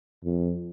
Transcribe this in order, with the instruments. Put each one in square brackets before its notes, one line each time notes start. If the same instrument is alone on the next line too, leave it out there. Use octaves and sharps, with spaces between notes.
[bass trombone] F2